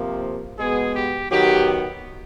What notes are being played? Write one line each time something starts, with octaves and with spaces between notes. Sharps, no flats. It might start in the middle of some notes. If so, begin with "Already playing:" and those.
Already playing: C3 F3 A#3
B2 G#3 B3 G#4
G4
D#3 F#3 B3 G4